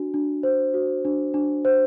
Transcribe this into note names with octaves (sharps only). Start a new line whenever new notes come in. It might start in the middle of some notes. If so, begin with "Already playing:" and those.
Already playing: D4 F#4
D4
C5
F#4
D4
D4
C5